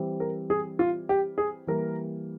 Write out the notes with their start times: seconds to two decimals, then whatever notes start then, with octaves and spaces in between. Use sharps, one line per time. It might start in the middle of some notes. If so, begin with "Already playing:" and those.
Already playing: E3 G3 C4
0.20 A#4
0.50 G#4
0.79 F4
1.09 G4
1.38 G#4
1.67 E3 G3 A#3 A#4